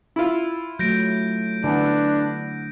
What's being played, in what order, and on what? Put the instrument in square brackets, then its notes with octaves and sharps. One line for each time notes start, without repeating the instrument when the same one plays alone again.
[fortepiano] E4 F4
[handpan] F#3 A3 [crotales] G6 A#6 D7
[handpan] D3 [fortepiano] E3 B3 [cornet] D4